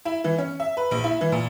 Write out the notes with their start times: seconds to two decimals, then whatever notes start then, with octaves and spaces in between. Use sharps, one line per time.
0.05 E4
0.24 E3
0.38 C#4
0.60 E5
0.77 B4
0.91 A#1
1.04 E4
1.21 E3
1.32 A#2